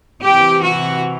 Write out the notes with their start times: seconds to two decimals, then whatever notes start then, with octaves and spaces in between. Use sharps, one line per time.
0.22 C3 E3 G4
0.63 F#4